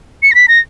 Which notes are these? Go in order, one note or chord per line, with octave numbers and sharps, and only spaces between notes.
C#7
A#6
B6
A#6